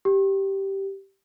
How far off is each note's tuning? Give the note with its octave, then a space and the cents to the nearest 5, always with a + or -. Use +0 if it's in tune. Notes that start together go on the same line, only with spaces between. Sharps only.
G4 -10